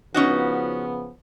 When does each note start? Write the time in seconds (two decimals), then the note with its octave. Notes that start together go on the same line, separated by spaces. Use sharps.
0.14 C#3 F3 B3 C#4 D#4 F#4